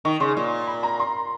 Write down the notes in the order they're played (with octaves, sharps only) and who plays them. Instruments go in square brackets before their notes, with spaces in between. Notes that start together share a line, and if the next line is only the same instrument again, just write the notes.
[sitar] D#3 [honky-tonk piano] C#6
[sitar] C#3 [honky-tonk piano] C6
[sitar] A#2
[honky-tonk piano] B5
A#5
C6